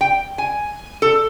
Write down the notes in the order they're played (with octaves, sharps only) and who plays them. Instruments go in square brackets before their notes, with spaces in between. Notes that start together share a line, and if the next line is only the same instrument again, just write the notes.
[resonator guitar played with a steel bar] G5
G#5
A4